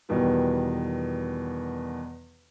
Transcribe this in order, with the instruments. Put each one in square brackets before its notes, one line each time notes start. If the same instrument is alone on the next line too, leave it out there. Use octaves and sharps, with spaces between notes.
[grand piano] E2 B2 D#3 G3 B3